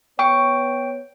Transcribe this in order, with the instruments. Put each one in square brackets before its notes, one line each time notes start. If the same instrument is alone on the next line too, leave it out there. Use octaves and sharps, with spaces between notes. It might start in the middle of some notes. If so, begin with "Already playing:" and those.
[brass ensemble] B3 C#5 [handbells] G5 [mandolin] C#6